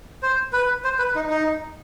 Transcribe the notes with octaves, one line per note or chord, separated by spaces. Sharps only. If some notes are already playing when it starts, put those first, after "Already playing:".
C5
B4
C5
B4
D#4
D#4